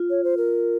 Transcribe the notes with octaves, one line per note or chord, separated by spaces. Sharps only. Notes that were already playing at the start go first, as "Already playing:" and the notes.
Already playing: F4
C#5
C5
A#4